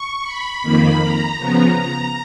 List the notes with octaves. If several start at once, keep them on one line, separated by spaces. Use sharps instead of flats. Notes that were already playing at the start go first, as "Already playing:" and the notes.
Already playing: C#6
B5
F2 D#3 A#3 B5
A#5
C#3 F3 B3